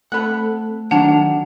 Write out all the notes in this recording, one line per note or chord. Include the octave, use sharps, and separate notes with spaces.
A3 C4 A4 F#5 B5 F#6
D#3 F#3 D4 F#5 A5 F7